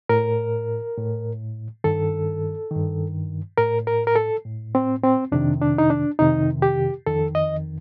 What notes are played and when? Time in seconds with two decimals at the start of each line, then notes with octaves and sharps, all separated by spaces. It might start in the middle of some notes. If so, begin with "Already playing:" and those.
0.09 A2 A#4
0.97 A2
1.84 G2 D#3 A4
2.71 G2 D#3
3.58 A2 A#4
3.87 A#4
4.07 A#4
4.15 A4
4.45 A2
4.75 C4
5.03 C4
5.32 F2 C3 D#3 D4
5.62 D4
5.78 D#4
5.90 D4
6.19 F2 C3 D#3 D#4
6.62 G4
7.06 F2 D#3 A4
7.35 D#5